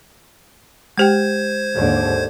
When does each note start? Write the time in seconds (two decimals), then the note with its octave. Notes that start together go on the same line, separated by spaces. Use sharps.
0.98 G#3 G4 C5 G5 G#6
1.75 D#2 G#2 D3